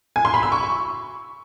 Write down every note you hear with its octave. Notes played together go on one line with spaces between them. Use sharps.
G#5
C6
B5
E6
C#6